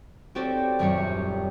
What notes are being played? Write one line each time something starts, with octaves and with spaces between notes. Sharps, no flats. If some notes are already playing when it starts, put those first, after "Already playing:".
C4 F#4 G4 A4 C#5 D5
D#1 F#2 G3 G4 C#5 C#7